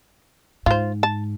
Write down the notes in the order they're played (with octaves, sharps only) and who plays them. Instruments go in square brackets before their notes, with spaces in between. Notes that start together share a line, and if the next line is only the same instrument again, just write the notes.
[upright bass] G#2 [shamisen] F4 C5
[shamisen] A5